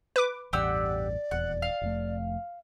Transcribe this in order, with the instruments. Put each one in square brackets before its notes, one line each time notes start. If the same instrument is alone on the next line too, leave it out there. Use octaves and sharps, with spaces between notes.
[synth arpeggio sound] B4 D6
[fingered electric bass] A1 E2 G2 [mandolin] G4 F#5 E6 [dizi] D5
[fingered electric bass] D#1 E2 [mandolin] F#5
[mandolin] F5
[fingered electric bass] F1 F2 A3